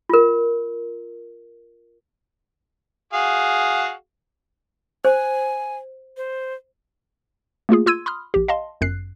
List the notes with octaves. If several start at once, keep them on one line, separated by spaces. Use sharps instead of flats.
F4 A#4
F#4 G#4 F5
C5 G#5
C5
A3 A#3 F4 G#4
F4 C6 E6 G#6 D#7
B5 C6 D#6 F6
A#1 G4
D#5 F5 A5 C6
G1 F#2 F#6 C7